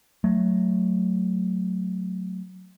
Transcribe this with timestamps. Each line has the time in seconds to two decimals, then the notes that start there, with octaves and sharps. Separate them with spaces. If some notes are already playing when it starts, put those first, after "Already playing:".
0.24 F#3 A3